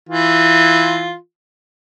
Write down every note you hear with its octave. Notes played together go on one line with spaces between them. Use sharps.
E3 F4